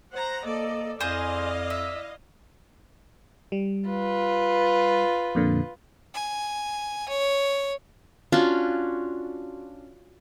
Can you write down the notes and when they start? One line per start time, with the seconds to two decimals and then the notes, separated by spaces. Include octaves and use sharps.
0.13 C5 F#5 A#5
0.46 A#3 A4 D5 D#5
1.00 F2 E4 G#4 C5 D5 D#5 F5
1.70 E5
3.52 G3
3.89 F4 B4
5.35 F2 A#2 D3
6.14 G#5
7.08 C#5
8.32 C#4 D4 F4 F#4